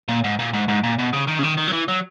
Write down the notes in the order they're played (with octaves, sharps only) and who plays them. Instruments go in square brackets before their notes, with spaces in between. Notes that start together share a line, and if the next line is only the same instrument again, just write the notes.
[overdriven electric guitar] A#2
G#2
A#2
G#2
G#2
A#2
B2
C#3
D#3
C#3
D#3
D#3
F#3
E3
F#3